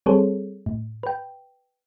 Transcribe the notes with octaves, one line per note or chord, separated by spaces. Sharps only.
G3 C4 G#4 A4 C5 C#5
A2
B4 G5